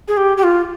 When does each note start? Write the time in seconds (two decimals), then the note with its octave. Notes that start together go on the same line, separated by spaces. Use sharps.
0.08 G#4
0.17 G4
0.37 G4
0.43 F4